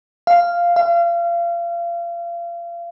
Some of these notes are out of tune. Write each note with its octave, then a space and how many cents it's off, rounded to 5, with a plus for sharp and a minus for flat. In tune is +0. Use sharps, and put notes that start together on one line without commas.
F5 -5
F5 -30